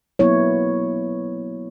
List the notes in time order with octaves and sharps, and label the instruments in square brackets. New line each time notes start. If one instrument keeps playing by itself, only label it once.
[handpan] F#3 A#3 B3 E4 C#5